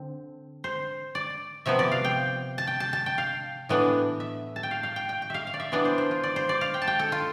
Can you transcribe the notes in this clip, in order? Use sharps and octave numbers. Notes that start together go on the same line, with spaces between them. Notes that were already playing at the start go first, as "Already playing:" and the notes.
Already playing: D3 C4
C5
D5
C3 F3 B3 E5
D5
F5
G5
A5
G5
A5
A5
G5
F5
A2 E3 B3 D4
E5
A5
G5
F5
F5
G5
G5
G5
E5 F5
F5
D5
E5
E3 B3 D4 D5
C5
C5
F4
D5
C5
D5
F5
G5
A5
G5
A4
F4